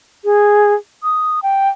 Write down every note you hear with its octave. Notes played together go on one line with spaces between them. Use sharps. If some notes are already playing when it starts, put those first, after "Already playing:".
G#4
D#6
G5